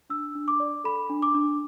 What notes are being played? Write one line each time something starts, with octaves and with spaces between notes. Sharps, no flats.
D4 E6
D4
D6
D5
A4 B5
D4
D6
D4